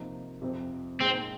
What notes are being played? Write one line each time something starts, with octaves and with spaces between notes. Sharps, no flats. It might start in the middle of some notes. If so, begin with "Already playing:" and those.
Already playing: C3 F3 A#3 D#4
F2 C3 F3 C4
A#2 G#3 C4 D#4